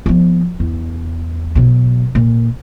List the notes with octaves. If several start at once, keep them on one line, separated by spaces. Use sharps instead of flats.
F3 B3
E2
B2 F#3
A#2